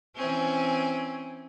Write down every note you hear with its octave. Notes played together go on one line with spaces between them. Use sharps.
E3 C4 C#4